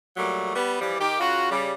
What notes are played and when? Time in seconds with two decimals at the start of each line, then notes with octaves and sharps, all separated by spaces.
0.17 A#2 F#3 G3 A3
0.55 G3 B3
0.81 E3 F3 G3
0.99 D#3 G4
1.20 C#3 F4 F#4
1.50 C#3 G3